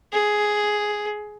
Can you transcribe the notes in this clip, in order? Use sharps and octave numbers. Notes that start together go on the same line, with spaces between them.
G#4